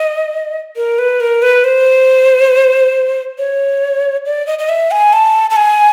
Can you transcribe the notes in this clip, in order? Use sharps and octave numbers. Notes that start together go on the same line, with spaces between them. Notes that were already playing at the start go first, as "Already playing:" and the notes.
Already playing: D#5
A#4
B4
A#4
B4
C5
C#5
D5
D#5
D#5
E5
G#5
A5
A5
G#5